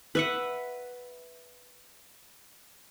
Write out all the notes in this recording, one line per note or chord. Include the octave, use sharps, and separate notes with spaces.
B4 E5 F#5